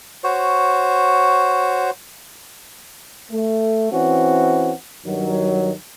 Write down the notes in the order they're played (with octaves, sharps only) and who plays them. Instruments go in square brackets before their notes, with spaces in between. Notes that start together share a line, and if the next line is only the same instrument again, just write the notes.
[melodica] F#4 C5 C#5
[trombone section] A3
E3 C4 C#4 F#4
G2 D#3 F#3